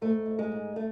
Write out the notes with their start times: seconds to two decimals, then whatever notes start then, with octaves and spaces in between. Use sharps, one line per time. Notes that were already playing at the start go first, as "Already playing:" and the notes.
0.01 G#2 A3
0.26 G#2
0.39 G#3
0.52 G#2
0.76 A3